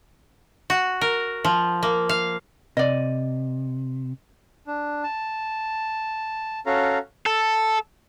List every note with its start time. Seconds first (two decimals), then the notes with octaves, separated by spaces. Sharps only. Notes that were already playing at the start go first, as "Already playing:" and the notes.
0.70 F#4
1.01 A#4
1.44 F3
1.83 A#3
2.09 F5
2.77 C3 D5 D#5
4.67 D4
5.03 A5
6.66 C#4 F#4 A4 F5 A#5
7.26 A4